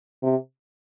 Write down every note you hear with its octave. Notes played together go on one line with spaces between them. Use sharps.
C3